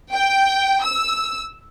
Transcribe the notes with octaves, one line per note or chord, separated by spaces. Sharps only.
G5
E6